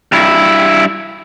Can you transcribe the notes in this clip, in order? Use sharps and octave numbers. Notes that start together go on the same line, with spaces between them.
G2 E4